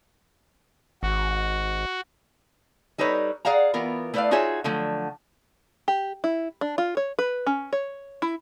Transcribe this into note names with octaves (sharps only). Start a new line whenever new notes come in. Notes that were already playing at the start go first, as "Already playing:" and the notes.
G#1 F#4
G3 D#4 A4 B4 C#5
G#4 D5 F5 F#5 A#5
E3 B3 F4 A#4
A3 E4 B4 C#5 D5 F5
D#4 F4 F#4 G#4 C#5 E5
D3 F3 F#3 A3
G4
E4
D4
F4
C#5
B4
C#4
C#5
E4